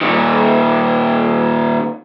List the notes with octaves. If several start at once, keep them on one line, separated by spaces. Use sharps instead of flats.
A#2 D#3